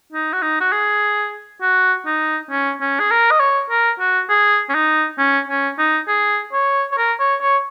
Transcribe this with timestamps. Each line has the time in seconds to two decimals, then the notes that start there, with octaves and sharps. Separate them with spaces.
0.13 D#4
0.33 F#4
0.42 D#4
0.60 F#4
0.72 G#4
1.62 F#4
2.06 D#4
2.51 C#4
2.81 C#4
3.00 G#4
3.11 A#4
3.31 D#5
3.40 C#5
3.70 A#4
4.00 F#4
4.29 G#4
4.69 C#4
4.74 D#4
5.19 C#4
5.48 C#4
5.78 D#4
6.08 G#4
6.53 C#5
6.92 C#5
6.98 A#4
7.20 C#5
7.41 C#5